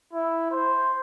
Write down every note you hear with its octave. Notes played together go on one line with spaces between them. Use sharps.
E4
C5